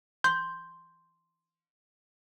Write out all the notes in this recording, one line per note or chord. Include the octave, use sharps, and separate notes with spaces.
C6 G6